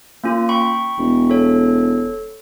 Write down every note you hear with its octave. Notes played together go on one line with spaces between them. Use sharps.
A#3 C#4 F4
G5 B5 C#6
E1
A4 C#5